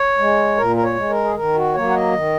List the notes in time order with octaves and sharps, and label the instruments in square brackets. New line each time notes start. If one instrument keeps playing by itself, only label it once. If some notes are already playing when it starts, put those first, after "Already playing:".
Already playing: [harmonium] C#5
G#3
A#2 A#4
A#4
C#5
G#3
A#4
G#4
D#3 A#4
F#4
F#3 A#3 C#5
F#5
D#5
D#3